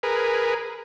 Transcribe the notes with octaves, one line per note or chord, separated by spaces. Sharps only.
G#4 A#4 B4